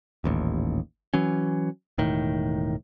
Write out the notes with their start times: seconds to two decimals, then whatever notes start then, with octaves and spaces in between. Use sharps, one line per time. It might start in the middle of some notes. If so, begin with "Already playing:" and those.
0.24 D#1 A1 D#2
1.14 E3 F#3 C#4
1.98 E1 A2 D#3